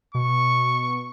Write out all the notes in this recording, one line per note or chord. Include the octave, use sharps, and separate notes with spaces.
B2 C#6